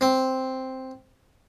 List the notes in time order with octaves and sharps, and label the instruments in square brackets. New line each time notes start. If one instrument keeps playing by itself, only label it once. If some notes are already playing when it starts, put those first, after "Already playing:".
[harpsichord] C4